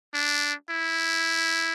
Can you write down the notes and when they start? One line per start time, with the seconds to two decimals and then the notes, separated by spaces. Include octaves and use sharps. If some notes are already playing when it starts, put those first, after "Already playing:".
0.14 D4
0.70 E4